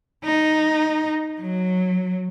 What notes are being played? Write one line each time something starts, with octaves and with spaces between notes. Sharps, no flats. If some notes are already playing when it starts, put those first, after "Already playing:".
D#4
F#3